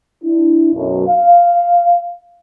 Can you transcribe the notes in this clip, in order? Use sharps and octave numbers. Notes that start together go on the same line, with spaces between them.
D4 E4
B1 F#2
F5